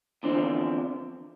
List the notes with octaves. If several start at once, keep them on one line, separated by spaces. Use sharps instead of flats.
E2 D3 F3 C4